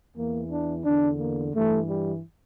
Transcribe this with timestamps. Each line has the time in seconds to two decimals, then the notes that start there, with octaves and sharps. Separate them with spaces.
0.16 E2 E3 A#3
0.51 D4
0.85 E2 D3 D4
1.20 A#3
1.54 G2 E3 A3
1.89 G3